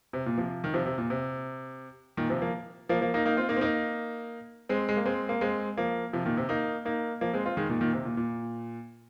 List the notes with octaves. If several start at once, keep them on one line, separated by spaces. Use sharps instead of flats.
C3
A#2
C3 F3
D#3
C3 F3
C3
A#2
C3
A#2 D#3
C3 F3
F3 A#3
F3 A#3
F3 A#3
A#3 D#4
A#3 D#4
C4 F4
A#3 D#4
C4
A#3 D#4
G#3 C4
G#3
A#3
G#3 C4
A#3
G#3 C4
F3 A#3
C3 F3
A#2 D#3
C3
A#3 D#4
A#3 D#4
F3 A#3
G#3 C4
C4 F4
D#3 G#3
A#2 D#3
A#2 D#3
C3
A#2
A#2